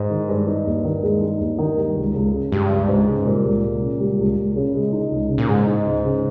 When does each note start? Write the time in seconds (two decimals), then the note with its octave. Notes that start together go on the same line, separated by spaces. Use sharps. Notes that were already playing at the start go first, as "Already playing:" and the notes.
Already playing: G#2
0.10 D#3
0.29 G2 G#3
0.47 D#4
0.66 D#2
0.85 D#3
1.03 G#3
1.21 D#4
1.40 D#2
1.58 D#3
1.77 G3
1.96 C#2
2.14 C#2
2.33 C#3
2.52 G2 G3
2.70 C#2
2.88 C#2 G#2
3.07 C#3
3.25 A#2 G3
3.45 C#2
3.63 C#2
3.82 C#3
4.00 G3
4.19 C#2
4.37 C#2
4.56 C#3
4.74 G#3
4.93 D#4
5.11 C#2
5.30 C#3
5.38 A#2
5.49 G#2 G#3
5.67 D#4
5.86 C#2
6.04 C#3